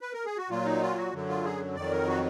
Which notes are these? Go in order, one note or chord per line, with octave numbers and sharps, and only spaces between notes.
B4
A#4
G#4
F#4
A#2 F#3 F4
D#4
F4
F#4
F#2 D3 F#3
F4
G#4
F2 D#3 F#3 D5
A#4
F#4